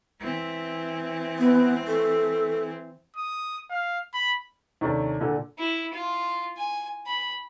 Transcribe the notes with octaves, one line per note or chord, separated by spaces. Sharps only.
E3 C4
B3
A4
D#6
F5
B5
D#2 C3 C#4 D4 A4 D5
A#2 D3 A4
E4
F4
G#5
B5